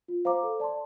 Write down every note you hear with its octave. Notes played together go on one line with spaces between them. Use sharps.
F4
C5 F5 A#5 D6
A4
D5 A5 C6